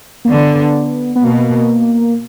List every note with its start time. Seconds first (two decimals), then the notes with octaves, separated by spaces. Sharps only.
0.25 A#3
0.30 D3 B3
1.15 B3
1.24 B2 A#3